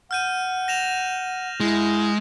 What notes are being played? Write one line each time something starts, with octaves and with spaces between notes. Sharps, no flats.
F#5 F6 G6 D#7
A#6 E7 F7
G#3 E4